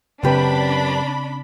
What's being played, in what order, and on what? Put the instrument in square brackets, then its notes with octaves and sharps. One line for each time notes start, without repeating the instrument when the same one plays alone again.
[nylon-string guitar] F#2 G4 B4 [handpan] C#3 C4 [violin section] D4 B5